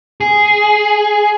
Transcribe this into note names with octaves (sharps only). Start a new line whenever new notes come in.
G#4